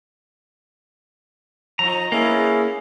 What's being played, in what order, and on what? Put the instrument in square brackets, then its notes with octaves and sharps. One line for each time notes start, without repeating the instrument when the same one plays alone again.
[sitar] F3 D#4 [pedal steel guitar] A#5
[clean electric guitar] A#3 [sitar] B3 G#4 [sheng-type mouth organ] C#4 E4